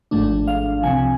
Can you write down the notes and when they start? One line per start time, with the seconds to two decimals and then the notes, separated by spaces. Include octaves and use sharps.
0.11 G#1 G#2 F3 A3 D4
0.48 F5
0.83 C2 C3 F3 G#5